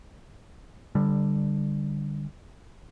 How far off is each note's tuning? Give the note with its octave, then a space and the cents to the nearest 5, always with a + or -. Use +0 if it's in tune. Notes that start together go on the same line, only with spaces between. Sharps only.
D3 +0 G3 +10